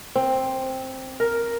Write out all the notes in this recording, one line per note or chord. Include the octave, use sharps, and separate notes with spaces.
C4
A#4